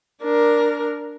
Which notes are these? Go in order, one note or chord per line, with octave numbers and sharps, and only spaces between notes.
D4 A#4